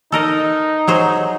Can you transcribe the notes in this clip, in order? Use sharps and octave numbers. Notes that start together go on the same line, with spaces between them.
D#4 A4 A#4 D#5
F#3 G#4 C5